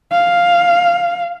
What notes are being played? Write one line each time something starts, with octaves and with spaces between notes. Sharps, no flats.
F5